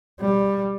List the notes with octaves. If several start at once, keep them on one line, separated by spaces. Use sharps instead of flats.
G3